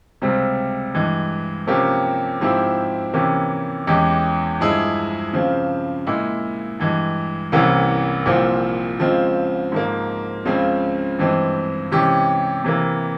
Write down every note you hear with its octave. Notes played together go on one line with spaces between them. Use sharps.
C#2 C3 G3 C4
G2 E3 G#3
C3 F3 A#3 C#4 G4
G#2 F3 C4 E4 G4
C3 E3 A#3 C#4 G4
E2 E3 G#3 C#4 G4
G2 F3 G#3 E4 G#4
C#3 F3 C4
A#2 G#3 E4
G2 E3 G#3
C2 C3 E3 A#3 C#4
C2 A#2 F3 C4 F4
C#3 F3 G#3 C4 F4
G#2 F3 A#3
C#2 C#3 F3 C4
G2 E3 G#3 C4
C3 E3 G#3 C#4 G4
C3 E3 A#3